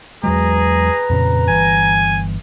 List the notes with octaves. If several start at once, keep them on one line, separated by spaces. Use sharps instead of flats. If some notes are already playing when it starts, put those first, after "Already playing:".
E2 F#3 G#3 G#4 B4 A#5
F2 A#2 C#3
G1 E3 G#5